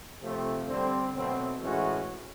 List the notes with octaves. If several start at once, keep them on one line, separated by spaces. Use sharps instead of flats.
C3 F3 A3 C4
D3 G3 C4
B2 F#3 A3 C4
A2 E3 G#3 C#4 F#4